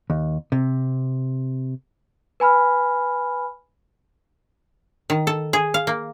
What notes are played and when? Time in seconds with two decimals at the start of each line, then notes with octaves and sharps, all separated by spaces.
0.10 D#2
0.52 C3
2.40 B4 G#5 B5 F6
5.10 D#3
5.27 A4
5.53 G#4
5.74 F5
5.87 A#3